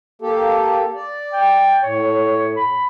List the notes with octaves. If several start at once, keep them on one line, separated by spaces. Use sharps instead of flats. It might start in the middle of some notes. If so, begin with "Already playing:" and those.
A#3 G4 A4
D5
G5
A2 C#5
B5